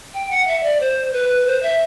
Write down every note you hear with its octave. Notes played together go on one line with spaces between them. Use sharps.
G5
F#5
E5
D5
C5
B4
C5
E5